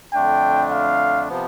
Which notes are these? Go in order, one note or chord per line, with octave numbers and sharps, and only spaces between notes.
F2 D3 A3 D4 G5
F5
C3 F3 B3